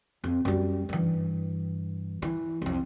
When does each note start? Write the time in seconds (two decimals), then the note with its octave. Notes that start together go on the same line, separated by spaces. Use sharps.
0.24 F2
0.45 F#2 G3
0.89 G2 E3
2.22 E3
2.62 C2 F2